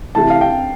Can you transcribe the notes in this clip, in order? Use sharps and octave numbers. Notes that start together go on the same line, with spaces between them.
C3 E3 A3 E4 G4 A5
F5
G5